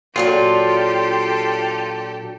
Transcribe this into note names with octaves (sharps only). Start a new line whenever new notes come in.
A#2 F#3 D4 F4 G4 A4